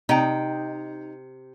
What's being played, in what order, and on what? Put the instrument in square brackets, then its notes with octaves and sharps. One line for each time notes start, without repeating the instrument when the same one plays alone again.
[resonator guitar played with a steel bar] C3 G5 [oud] D#4